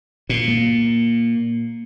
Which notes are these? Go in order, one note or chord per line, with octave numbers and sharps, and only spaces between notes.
A#2
A#3